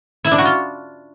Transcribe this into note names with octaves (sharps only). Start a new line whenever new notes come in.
E4
D4
F#4
F4